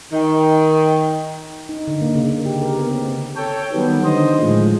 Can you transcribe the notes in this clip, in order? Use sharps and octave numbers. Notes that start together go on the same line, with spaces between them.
D#3
D#4
D3
A#3
C#3
A#3
G4
A#4
B3
C4
A4 C#5 G5
D#3 F#3 G3 B3
D3 D#3 C5 D#5
A2 F3 G#3